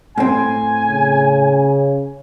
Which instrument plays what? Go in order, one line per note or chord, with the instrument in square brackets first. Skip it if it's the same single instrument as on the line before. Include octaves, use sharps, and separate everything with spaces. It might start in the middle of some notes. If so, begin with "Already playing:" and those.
[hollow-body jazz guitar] A2 C4 [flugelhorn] G#5
[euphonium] C#3